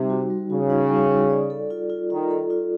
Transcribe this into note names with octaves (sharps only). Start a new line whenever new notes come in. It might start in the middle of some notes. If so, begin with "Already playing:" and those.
Already playing: C3 G3 D#4
F#4
G3
C#3 F#4
D#4
G3
D#4
D5
A4
F4
F4
D#3 F4
A4
F4